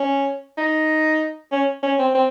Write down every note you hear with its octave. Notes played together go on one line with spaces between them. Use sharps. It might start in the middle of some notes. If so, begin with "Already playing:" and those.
Already playing: C#4
D#4
C#4
C#4
C4
C4